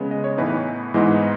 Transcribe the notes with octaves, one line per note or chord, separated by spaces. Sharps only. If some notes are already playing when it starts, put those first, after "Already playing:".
Already playing: C#3 G#3 B3
D#5
C#5
A2 E3 B3 D#4 B4
G#2 E3 G#3 B3 D#4